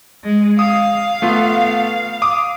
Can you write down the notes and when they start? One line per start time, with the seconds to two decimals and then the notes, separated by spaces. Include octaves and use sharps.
0.24 G#3
0.59 F5 D#6
1.22 A3 B3 F4
2.22 D6 D#6